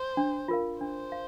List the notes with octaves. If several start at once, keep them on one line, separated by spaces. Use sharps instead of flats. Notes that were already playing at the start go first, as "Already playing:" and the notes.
Already playing: C5
D4
F4 A#4 F5
D4 C5
F5